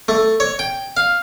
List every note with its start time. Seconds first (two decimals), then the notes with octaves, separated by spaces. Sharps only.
0.08 A3
0.40 C#5
0.59 G5
0.97 F5